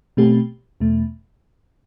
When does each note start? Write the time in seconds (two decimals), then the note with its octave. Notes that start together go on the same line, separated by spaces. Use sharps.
0.17 B2 A3 C4 G4
0.80 E2 B2 A3